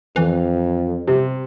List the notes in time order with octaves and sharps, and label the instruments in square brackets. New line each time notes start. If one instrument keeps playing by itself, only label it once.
[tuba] F2 [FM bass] E3
[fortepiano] C3